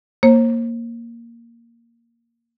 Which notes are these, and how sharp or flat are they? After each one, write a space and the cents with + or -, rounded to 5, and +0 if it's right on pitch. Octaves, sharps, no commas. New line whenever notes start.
A#3 +0 C5 +35